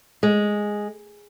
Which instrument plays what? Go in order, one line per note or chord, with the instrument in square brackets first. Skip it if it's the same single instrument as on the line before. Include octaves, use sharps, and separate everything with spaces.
[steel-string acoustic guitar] G#3